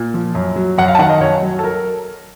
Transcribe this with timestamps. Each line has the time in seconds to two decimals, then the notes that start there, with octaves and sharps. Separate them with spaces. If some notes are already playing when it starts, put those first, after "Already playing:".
Already playing: A#2
0.14 F3
0.35 F#2
0.56 F#3
0.78 F#2 F#5
0.88 F5
0.95 A5
0.99 D#3 F#5
1.09 D#5
1.20 F#2 C#5
1.43 F#3
1.59 A4
1.64 A#4